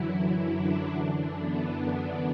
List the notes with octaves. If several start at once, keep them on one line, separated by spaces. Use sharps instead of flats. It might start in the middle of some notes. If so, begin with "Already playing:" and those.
Already playing: F#2 D3 E3 F#3 E4
D3 D4
F#2 E3
B3
B3